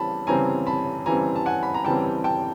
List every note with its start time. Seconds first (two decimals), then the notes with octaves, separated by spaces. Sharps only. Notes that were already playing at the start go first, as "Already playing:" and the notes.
Already playing: C#3 E3 G3 C4 A5 B5
0.27 C#3 E3 G3 C4 G#5 A#5
0.67 A5 B5
1.06 C#3 E3 G3 C4 G#5 A#5
1.36 A5
1.46 F#5 G#5
1.63 B5
1.74 A#5
1.85 C#3 E3 G3 C4 G5 A5
2.24 G5 A5